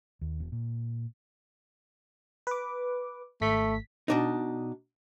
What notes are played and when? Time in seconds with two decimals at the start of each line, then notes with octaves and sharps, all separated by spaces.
0.21 D#2
0.40 E1
0.52 A#2
2.47 B4 D6
3.41 G#1 A3 B6
4.08 B2 D4 D#4